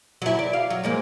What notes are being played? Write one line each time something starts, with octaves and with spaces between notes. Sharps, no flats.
F#3 E4
D5
F5
F#3
F3 G#3 A#3